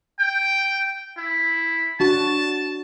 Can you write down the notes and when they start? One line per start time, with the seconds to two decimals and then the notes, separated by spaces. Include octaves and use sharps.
0.19 G5
1.17 E4
2.00 D4 F#4 A5